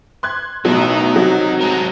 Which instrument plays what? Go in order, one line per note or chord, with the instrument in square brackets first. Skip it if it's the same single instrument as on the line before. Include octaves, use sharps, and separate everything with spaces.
[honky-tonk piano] C6 F#6 G#6
[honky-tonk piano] A1 B2 F#3 [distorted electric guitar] D#3 D#4
[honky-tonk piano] C3 F#3
[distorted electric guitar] G#3 A#4